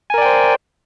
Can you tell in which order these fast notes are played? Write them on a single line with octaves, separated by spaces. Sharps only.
G#5 A#4 D5 G5 C5